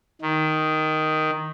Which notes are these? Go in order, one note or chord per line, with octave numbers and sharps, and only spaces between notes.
D#3